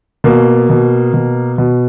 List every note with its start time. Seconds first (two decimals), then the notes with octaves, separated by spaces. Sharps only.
0.24 B2 A#3
0.70 B2
1.14 B2
1.58 B2